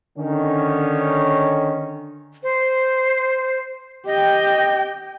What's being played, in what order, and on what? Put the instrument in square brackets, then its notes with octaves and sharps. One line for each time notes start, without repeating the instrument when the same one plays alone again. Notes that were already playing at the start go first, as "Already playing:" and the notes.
[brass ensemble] D3 D#3 C#4
[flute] C5
[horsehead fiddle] G4 G5 [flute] D#5